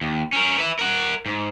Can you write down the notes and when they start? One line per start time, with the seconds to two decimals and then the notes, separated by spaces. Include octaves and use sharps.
0.01 D#2
0.33 C#4 A#4
0.58 B4 E5
0.79 A#4 F#5
1.26 G#2